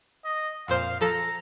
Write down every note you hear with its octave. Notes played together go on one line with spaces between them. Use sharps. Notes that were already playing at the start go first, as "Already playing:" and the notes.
D#5
F2 A#2 C5 F5
F3 A4 A#5